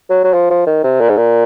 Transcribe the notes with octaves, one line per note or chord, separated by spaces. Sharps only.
F#3
F#3
F3
F3
D#3
C3
A#2
G#2
A#2